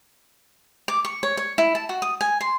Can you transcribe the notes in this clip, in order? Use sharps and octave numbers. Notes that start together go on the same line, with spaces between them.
D6
C#6
C#5
C#5
E4
A5
F#4
D#6
G#5
C6